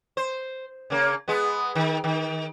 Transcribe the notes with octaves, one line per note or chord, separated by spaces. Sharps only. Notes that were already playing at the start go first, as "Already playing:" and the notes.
C5
C#3 A#3
G#3 B3
D#3
D#3